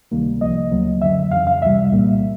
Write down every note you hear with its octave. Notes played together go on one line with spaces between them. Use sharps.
C#2 C3 D#3 G3 A#3
C2 C3 F3 A#3 D#5
D2 C#3 F#3 A#3
F#2 D3 F#3 E5
F2 C#3 E3 F5
F5
C#2 C3 E3 G3 E5
C2 A#2 G3 A#3